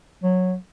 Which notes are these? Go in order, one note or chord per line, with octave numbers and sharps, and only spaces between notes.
F#3